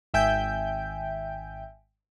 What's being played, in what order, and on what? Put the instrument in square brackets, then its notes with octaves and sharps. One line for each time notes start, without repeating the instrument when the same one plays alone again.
[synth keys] G#1 E5 G5 G#5 G6